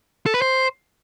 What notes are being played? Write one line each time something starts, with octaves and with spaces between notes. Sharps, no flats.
A4
B4
C5